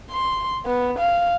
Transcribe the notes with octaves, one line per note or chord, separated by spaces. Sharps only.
C6
B3
F5